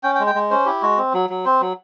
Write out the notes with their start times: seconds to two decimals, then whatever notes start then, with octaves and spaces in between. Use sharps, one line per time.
0.03 C#4 G5
0.15 G5
0.20 G#3
0.27 G5
0.35 G#3
0.51 C#4 C5
0.66 E4 G4
0.82 G#3 F#4
0.98 C4
1.13 F#3
1.30 F#3
1.45 C4 C5
1.61 F#3